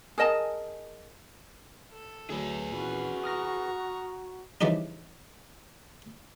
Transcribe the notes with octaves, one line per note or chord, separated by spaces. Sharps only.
G#4 A#4 D#5 A5
A4
D2 F#3 G#4 B4
A#2 E3 B3 C#4 F#4
A#5 C#6 D#6 F6 A#6
C#3 E3 F3 G3 D4 D#4